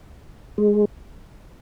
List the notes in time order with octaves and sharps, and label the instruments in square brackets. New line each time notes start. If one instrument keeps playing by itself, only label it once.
[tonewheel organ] G#3